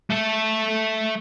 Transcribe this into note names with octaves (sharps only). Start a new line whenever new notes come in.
A3 A4